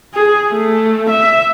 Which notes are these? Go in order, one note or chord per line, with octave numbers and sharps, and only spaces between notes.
G#4
A3
E5